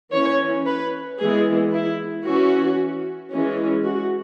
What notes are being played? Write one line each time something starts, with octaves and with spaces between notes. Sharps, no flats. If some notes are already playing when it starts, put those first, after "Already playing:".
E3 C#4 C#5
B4
E3 G#3 B3 G#4
E4
E3 C#4 F#4
E3 G#3 C#4
F#4